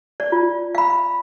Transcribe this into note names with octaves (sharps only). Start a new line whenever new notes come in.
D5
F4
F5 B5